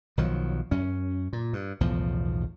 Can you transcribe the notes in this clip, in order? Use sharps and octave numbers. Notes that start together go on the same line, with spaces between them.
B1 D#3 F3 F#3
F#2 C#4
A#2
G2
B1 E2 A2 F3